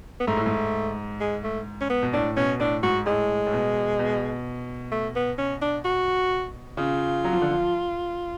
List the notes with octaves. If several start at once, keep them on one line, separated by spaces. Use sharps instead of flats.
B3
G#2 A3
A2
G#2
G#3
A3
C#4
B3
B2
A2 D4
B2 C#4
A2 D4
G#2 F#4
A2 G#3
A2
B2
B2
A3
B3
C#4
D4
F#4
C#3 F4
F#3
F3
D3
F3